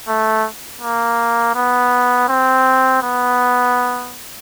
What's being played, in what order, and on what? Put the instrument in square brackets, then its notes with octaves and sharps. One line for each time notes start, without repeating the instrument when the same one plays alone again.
[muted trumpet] A3
A#3
B3
C4
B3